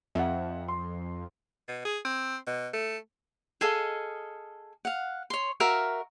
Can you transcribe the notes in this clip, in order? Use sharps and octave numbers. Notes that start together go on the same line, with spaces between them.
F2 E5 F#5
C6
B2
G#4
C4
B2
A3
G#4 A4 D#5 F5
F5 F#5
C#5 C6
F#4 A#4 E5 F5